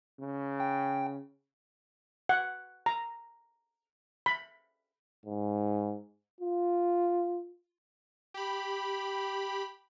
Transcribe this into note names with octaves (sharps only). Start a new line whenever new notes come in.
C#3
G5
F#5
A#5
B5
G#2
F4
G4 B5